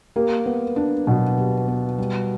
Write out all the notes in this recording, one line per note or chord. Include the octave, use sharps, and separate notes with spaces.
A#3 G4
B3
D4
B2 F#3
G4
B3
G3